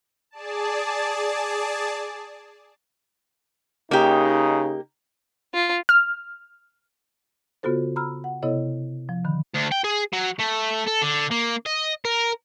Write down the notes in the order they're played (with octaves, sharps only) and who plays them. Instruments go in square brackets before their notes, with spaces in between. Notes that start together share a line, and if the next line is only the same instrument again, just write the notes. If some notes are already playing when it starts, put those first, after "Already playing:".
[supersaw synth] G#4 D5 A5
[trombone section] C#3 D#4 [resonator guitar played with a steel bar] A#3 G4
[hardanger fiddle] F4
[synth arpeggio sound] F6
[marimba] C#3 B3 F4 F#4 A4 C5
A#5 B5 E6 F6
F#5
C3 B3 E4 A4 C#5 D#5
F3
D3 D#3 B5
[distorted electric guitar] D2
G5
G#4
F#3
A3
A4
D3
A#3
D#5
A#4